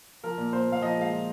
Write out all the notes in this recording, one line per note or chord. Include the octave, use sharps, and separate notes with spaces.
F3 A#4
A#2
A#2 C5
A#2 F5
F3 D#5
G#3 F5
F3